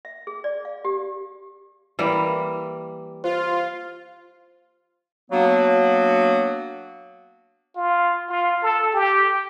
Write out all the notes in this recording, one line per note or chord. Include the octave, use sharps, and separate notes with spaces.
E5
G#4
D5
F5
G4
E3 G3 A#3
F4 C5
F#3 A#3 B3 D4 F#4
F4
F4
A4
G4